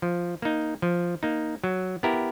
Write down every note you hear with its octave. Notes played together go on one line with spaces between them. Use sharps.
F3
A#3 D#4
F3
A#3 D#4
F#3
B3 E4 G4 A#4